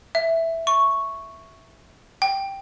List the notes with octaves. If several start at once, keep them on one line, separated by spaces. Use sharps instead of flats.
E5
C#6
G5